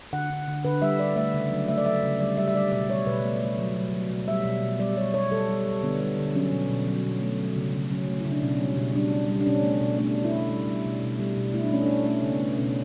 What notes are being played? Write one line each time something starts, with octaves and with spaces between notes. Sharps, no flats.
D3 F#5
D3
D3
D3 B4
G3 E5
G3 D5
A3 E5
C#3
F#3
A3 E5
D5
F#3 E5
C#3
G3 D5
G3 E5
E5
G3 D5
B2 D5
G3 C#5
B2 B4
A3
A3
F#3
F#3
F#3
B2
G3 E5
B2
B2
G3 D5
G3 C#5
G3 C#5
G3 A4
G3
G3
D3 B3
G3
D3
F#3 C#4
B2
B2
F#3
B2
A3
F#3
C#3
C#3
F#3 C#4
A3
E4
C#3
D4
B2 C#4
G3
B2
G3 D4
G3
G3
D4
B2 C#4
A3
B2
A3 D4
A3
E4
A3
G3
G3
B2
B2
G3
B2
A3 E4
D4
A3 C#4
D4
A3
A3 C#4
C#3
B3
A3
B2 C#4